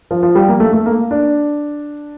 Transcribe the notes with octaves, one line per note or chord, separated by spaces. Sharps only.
F3
F3
G3
A#3
A3
A3
A#3
D4